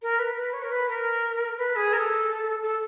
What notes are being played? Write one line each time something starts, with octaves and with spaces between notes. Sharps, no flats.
A#4
B4
B4
C#5
A#4
B4
A#4
B4
G#4
A#4
A4
A4